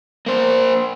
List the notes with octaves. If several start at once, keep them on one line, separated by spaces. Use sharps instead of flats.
A#3 C5